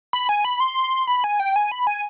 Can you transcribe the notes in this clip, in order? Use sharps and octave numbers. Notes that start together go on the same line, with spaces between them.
B5
G#5
B5
C6
B5
G#5
G5
G#5
B5
G#5